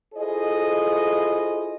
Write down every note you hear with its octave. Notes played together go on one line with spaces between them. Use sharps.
E4 F4 G#4 A4 C5 D#5